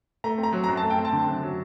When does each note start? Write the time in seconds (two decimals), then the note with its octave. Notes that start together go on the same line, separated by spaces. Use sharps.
0.24 A3 A#5
0.38 C4
0.43 A#5
0.53 F#3
0.64 F#2 A#5
0.77 A5
0.83 A3
0.90 G5
0.99 C4
1.05 A5
1.13 D3
1.28 F#2
1.43 F#3